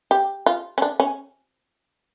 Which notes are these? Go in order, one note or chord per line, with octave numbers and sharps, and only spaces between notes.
G4
F4
C#4
D4
C#4